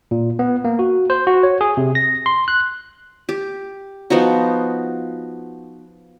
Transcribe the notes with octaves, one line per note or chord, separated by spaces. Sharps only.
A#2
B3
A#3
F#4
C5
F#4
C#5
G#4
C3
A#6
C6
F#6
G4
F3 B3 D#4 F#4